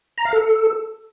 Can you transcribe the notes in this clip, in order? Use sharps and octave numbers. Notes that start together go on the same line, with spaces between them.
A#5
F5
A4